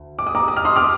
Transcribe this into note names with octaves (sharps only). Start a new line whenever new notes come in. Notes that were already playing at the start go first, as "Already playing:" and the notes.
Already playing: D2
D6
D#6
A#5 D6
D#6
F6
C6 D#6
D6 F6